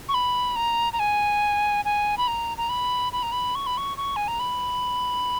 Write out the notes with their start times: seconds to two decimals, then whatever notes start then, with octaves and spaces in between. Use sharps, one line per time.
0.09 C#6
0.14 B5
0.56 A#5
0.93 A#5
0.99 G#5
1.85 G#5
2.18 B5
2.28 A#5
2.58 A#5
2.69 B5
3.13 B5
3.23 A#5
3.32 B5
3.55 C#6
3.67 B5
3.77 C#6
3.97 C#6
4.16 G#5
4.28 A#5
4.40 B5